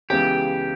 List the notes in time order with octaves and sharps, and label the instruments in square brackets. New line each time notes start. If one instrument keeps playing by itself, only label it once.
[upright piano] C#2 C#3 E3 B3 [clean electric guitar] G4